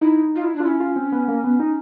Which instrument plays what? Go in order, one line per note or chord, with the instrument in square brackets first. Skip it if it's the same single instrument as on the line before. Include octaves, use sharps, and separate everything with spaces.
[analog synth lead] D#4 [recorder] E4
[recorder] F4
E4
D4
[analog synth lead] F4
[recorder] C#4 [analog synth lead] E4
[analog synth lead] F4
C4
B3
A#3
B3
D#4